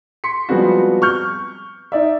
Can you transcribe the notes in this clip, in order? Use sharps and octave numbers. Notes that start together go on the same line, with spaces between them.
C6 B6 C#7
F3 G3 G#3 B3 C4 F#4
C#6 F6 G6
D#4 D5 E5